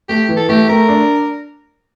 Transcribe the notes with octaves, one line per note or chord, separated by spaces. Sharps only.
A3 G4
E3
A4
A3 G4
A3 A#4
D4